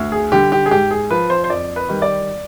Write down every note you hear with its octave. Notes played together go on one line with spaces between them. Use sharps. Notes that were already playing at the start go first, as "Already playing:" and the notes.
Already playing: D2
G#4
D3 G3 G4
G4
G#4
G#2 G4
G#4
F3 B4
C5
C5
F2 D5
B4
D#3 G3
D5